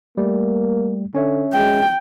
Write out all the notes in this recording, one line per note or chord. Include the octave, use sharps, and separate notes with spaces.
G3 A3 A#3
D3 C#4 C#5 E5
G#3 G5